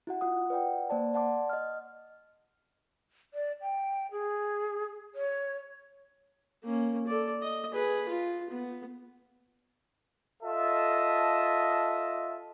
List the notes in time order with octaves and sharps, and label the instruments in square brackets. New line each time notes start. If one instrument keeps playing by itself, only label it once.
[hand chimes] E4 F#4 F#5
F4 F#5 D#6
B4 D5 F#5 G5
A#3 C5 D5 A5
D5 F#5 A5 C6 D6
D#5 F6
[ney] D5
G5
G#4
C#5
[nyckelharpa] A#3 C#4
A4 D5
D#5
G#4 B4
F4
B3
[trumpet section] F4 A4 D#5 E5 A5